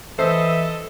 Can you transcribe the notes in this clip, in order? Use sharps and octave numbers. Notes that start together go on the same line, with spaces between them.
E3 A4 C5 D#5 E5